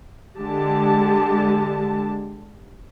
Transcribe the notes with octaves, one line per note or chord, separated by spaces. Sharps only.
D3 G#3 G4 A5